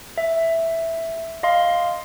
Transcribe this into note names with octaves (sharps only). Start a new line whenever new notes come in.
E5
D#5 F5 C6